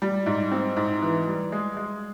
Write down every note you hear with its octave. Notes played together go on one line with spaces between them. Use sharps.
G3
G#2
C4
G#2
E3
G3
G#3
G#3